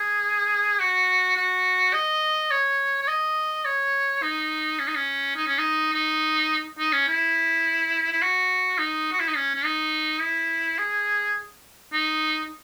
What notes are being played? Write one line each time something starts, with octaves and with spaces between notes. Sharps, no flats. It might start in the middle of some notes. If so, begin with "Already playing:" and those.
Already playing: G#4
F#4
F#4
D#5
C#5
C#5
D#5
C#5
D#4
C#4
D#4
C#4
D#4
C#4
D#4
D#4
D#4
C#4
E4
E4
F#4
D#4
F#4
E4
D#4
C#4
C#4
D#4
E4
G#4
D#4